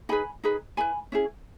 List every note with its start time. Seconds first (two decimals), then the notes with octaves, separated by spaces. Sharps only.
0.09 D#4 G#4 B4 G#5 B5
0.44 D#4 G#4 B4
0.77 E4 G#4 B4 G#5 B5
1.12 C#4 E4 G#4